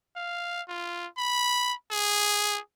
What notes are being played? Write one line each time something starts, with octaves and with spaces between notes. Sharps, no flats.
F5
F4
B5
G#4